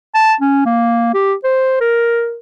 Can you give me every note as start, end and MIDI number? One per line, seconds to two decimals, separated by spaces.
0.15 0.33 81
0.41 0.63 61
0.66 1.12 58
1.14 1.34 67
1.44 1.79 72
1.80 2.38 70